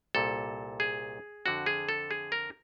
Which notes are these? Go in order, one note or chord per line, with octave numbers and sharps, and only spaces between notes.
C2 A#2 A4
G#4
F2 D3 F#4
G#4
A4
G#4
A#4